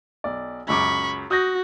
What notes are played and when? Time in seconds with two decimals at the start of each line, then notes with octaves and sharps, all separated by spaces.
0.24 B1 D5
0.68 C#2 F#2 B5 C#6 D6
1.31 F#4 D#6 G6 A#6